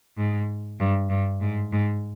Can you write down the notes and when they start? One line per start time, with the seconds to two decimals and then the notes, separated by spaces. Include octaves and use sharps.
0.17 G#2
0.79 G2
1.10 G2
1.41 G#2
1.72 G#2